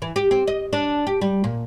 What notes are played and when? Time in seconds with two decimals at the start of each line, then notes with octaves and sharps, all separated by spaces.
0.02 E3
0.16 G4
0.31 C4
0.48 D#5
0.73 D4
1.07 G4
1.21 G3
1.44 A#2